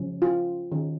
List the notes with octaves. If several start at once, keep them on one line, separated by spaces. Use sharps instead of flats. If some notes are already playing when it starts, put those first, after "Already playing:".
Already playing: C#3 F3 C#4
F4
D#3 C#4